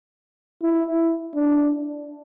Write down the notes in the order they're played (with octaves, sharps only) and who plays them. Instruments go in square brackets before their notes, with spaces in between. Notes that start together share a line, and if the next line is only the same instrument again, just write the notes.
[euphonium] E4
D4